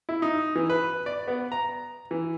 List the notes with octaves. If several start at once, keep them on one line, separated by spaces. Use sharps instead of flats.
E4
D#4
E3
B4
D5
B3
A#5
E3